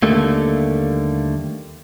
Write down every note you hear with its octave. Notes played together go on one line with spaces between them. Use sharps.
D#2 D3 G3 A3 A#3